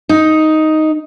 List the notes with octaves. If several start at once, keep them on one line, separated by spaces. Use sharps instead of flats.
D#4